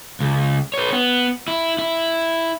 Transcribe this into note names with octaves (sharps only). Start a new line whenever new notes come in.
C#2
B4 C#5
B3
E4
E4